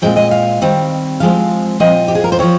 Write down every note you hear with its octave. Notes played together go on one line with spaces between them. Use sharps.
A#2 G#3 C4 G5
D#5
F5
D#3 G3 C4
F3 G#3 C4 F5
A#2 F3 C4 D#5
G4
G#4
A#4
C5
F3 C4 C#5